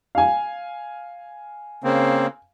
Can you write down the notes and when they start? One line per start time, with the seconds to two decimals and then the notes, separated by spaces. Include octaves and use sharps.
0.15 F5 G#5
1.84 C#3 A#3 C4